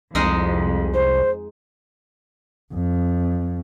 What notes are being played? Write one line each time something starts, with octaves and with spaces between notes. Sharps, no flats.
C2 F2 G#3 D#4
C5
F2